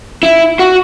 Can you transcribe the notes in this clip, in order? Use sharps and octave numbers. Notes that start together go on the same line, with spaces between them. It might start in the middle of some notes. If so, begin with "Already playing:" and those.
E4
F#4